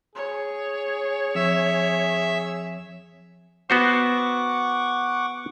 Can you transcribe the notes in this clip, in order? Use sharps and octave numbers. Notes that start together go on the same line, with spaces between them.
G#4 C#5
F2 E5
B3 F#4 C5 F#5 C#6 D6